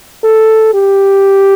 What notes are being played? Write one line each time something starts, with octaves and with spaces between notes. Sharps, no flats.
A4
G4